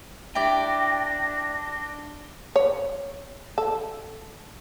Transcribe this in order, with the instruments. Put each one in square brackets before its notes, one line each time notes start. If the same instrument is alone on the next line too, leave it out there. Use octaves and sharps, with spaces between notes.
[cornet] D4 [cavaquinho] E4 G4 D5 [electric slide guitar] G5 [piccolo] A#6
[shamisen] C#5
A4